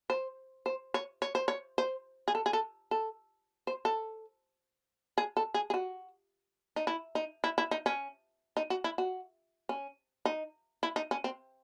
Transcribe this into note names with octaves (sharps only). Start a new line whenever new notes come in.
C5
C5
C#5
C#5
C5
C#5
C5
G#4
A4
G#4
A4
A4
C5
A4
G#4
A4
G#4
G#4
F#4
D#4
E4
D#4
E4
E4
D#4
C#4
D#4
F#4
E4
F#4
C#4
D#4
E4
D#4
C#4
C4